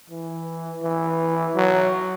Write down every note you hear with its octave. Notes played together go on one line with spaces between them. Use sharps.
E3
E3
F#3